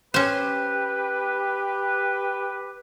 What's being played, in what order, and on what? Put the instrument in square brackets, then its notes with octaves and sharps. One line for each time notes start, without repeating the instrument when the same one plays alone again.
[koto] C#4 C5 [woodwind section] G4 B4